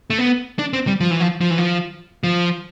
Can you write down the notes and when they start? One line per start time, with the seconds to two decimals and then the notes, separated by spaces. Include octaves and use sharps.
0.10 A3
0.18 B3
0.59 D4
0.73 C4
0.87 G3
1.00 F3
1.11 E3
1.20 F3
1.41 F3
1.51 E3
1.58 F3
2.23 F3